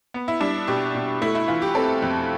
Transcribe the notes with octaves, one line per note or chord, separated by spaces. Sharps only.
B3
E4
G3 D4
B2 G4
B2
A3 E4
E4
E3 F4
G4
C4 A4
F2